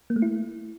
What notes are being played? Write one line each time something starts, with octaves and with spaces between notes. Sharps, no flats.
A#3
A3
E4